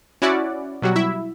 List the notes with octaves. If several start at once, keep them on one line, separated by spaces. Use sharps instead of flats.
C#4 E4 F#4 D5 F#5
B2 F#3 G3 F#4
E4 E5